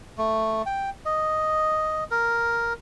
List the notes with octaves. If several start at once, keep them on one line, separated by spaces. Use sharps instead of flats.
A3
G5
D#5
A#4